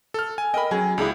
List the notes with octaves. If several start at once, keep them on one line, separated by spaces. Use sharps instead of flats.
A4 F6
G#5
A#4 D#5 G5 B5
F#3 C#4 G#4
C#2 D4 E4 G#4 A#5